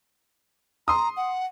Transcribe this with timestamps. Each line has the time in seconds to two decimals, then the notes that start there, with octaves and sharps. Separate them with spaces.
0.88 A#5 C6 D#6
1.17 F#5